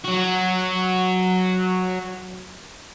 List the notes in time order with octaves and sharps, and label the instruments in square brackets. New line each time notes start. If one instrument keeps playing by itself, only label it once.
[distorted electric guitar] F#3 F#4